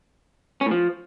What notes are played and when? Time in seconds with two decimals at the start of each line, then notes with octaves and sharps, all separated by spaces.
0.61 C#4
0.66 A2
0.71 F3